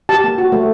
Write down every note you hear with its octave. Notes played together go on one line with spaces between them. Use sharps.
G4 A5
A#3
F#4
A3